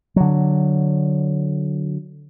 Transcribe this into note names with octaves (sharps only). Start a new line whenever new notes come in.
D3 F#3